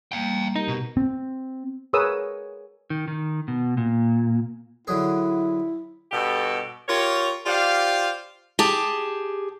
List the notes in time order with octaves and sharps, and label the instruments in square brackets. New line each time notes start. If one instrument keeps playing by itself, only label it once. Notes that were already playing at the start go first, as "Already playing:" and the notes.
[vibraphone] G3 A#3 A#5 [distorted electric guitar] F5 G5
[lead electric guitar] D#4 [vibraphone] G4 A#4
[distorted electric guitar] B2
[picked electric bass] C4
[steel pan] G#4 A#4 B4 C#5 D#6 E6
[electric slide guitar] D#3
D#3
B2
A#2
[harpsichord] D3 F#3 G#4 [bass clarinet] E4
[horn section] G2 B2 B3 G4 A4
F4 G4 A#4 C#5
F4 G4 C5 D5 F5
[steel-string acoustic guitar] G4 G#4 A5